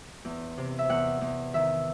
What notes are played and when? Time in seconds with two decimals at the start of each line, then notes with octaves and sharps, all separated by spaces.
0.25 E2
0.58 C3
0.79 E5
0.89 E2 F#5
1.21 E2
1.54 D#3 E5